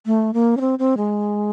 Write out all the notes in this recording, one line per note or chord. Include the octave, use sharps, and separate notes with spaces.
A3
A#3
C#4
C4
C4
G#3